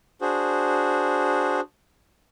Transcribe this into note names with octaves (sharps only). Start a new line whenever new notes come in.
D4 F#4 G#4 C5